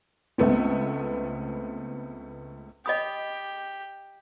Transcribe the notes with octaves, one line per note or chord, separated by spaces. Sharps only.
C#2 A3 B3 C4
G4 D#5 B5 D#6